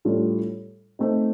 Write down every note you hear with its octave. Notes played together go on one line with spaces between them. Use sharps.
A2 G3 D4 F4 A4
A3 C4 D#4